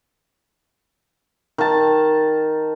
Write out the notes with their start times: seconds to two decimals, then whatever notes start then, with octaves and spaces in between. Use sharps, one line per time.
1.58 D#3 A5